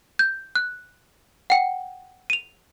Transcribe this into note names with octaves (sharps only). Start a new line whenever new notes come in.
G6
F#6
F#5 G5
D#7 F7